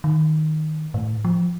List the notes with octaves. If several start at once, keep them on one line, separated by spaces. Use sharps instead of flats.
D#3
A2
F3